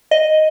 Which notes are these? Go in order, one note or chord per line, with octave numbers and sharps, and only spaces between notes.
D#5